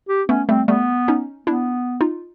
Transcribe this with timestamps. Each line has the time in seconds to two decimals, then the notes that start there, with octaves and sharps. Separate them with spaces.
0.09 G4
0.29 A3 B3 C#4
0.48 G3 A3 C4
0.68 G3 A3 B3
1.08 C#4 D#4
1.47 B3 D4 E4
2.01 D#4 F4